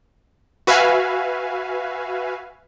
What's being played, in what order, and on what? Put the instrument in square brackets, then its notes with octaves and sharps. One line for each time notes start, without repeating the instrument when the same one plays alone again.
[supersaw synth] F#4 B4 E5 F5 G#5